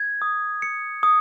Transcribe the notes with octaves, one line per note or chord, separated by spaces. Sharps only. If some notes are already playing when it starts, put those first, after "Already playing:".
Already playing: G#6
D#6
C#7
D#6